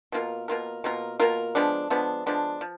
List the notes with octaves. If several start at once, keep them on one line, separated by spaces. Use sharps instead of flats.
B2 A#3 F4 A#4
B2 A#3 F4 A#4
B2 A#3 F4 A#4
B2 A#3 F4 A#4
F3 G#3 B3 D4
F3 G#3 B3 D4
F3 G#3 B3 D4
F3